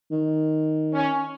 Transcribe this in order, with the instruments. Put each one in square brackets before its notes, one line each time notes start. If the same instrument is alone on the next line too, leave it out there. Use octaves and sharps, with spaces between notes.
[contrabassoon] D#3
[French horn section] C#4